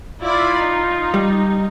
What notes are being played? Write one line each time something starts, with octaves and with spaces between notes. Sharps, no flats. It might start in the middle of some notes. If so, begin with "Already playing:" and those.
E4 F4 D5 B5
D#4
G3